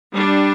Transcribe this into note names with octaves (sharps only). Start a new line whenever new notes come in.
G3 D4